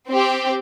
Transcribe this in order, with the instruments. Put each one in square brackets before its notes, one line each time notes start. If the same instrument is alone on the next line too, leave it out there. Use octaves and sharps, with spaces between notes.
[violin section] C4 G4